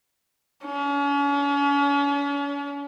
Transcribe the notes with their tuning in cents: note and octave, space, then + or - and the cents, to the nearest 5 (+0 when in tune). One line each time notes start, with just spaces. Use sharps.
C#4 +40